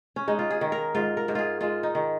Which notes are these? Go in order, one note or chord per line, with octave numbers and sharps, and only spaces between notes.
C#4
G#3 D#4
F4
G#4
D#3
A#4
G#2 F4
A#4
G#2
F4 G#4
G#3 F4
D#4
D#3